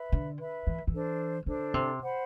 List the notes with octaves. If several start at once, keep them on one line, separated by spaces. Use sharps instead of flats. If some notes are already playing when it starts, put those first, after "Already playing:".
Already playing: B4 E5 B5
D3
B4 E5 B5
E3
E3
D4 A4 C5
D3 D4 A4 C5
C3
C5 F#5 B5